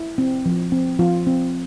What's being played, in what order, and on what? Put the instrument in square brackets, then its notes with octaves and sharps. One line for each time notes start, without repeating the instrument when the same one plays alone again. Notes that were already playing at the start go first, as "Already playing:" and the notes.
Already playing: [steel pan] E4
C4
F3
C4
F3 F4
C4